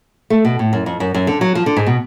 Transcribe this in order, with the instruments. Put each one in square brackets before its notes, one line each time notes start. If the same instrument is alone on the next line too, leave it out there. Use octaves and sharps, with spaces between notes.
[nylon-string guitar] A3
B2
A2
F#2
F2
F#2
F#2
D3
F#3
F3
D3
G#2
B2